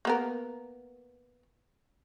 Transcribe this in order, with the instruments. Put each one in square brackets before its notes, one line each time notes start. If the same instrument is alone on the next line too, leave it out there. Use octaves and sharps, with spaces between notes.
[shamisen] A#3 B3 A#4